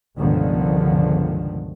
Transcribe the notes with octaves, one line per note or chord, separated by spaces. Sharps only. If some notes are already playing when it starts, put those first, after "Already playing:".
G1 C#2 B2 D3 D#3 F3